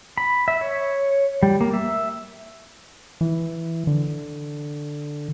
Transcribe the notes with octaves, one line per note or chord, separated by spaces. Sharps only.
B5
E5
C#5
G3
A#3
E5
E3
D3